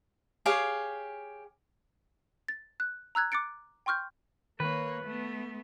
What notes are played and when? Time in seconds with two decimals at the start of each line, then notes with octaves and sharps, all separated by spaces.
0.46 G4 G#4 C#5 F5
2.48 A6
2.80 F#6
3.15 A#5 E6 F#6 G#6
3.32 D6 F#6 A6 C#7 D7
3.86 G5 C6 C#6 F6 G6
4.60 D#3 A#3 B4 C#5
5.04 A3 B3